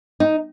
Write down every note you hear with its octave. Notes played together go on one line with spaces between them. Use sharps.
D#4